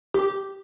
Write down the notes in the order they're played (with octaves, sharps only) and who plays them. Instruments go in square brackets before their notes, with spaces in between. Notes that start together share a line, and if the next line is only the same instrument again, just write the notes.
[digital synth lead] G4